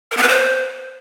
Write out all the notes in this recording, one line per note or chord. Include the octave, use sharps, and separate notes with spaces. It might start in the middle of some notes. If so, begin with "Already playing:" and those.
A#4
B3
B4
C5